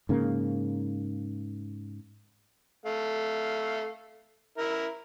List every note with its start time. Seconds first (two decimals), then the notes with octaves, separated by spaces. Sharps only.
0.09 G#2 C#3 A#3
2.86 A3 F5
4.58 E4 A#4 E5